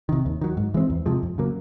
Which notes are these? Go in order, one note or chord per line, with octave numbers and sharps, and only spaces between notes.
C3 D#3
D#2
D#3 F#3
G#2
E3 G#3 C4
E2
C3 F3 G#3
F2
C#3 F#3 A#3